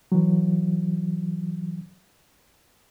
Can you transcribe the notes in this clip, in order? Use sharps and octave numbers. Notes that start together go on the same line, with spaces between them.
E3 F#3